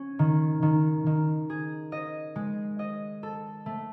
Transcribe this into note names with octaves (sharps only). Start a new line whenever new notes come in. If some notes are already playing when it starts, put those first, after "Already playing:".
Already playing: C#4
D#3
D#3
D#3
G#4
D#5
G#3
D#5
A4
A3